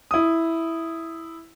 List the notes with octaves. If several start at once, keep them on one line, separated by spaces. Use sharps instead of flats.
E4 D#6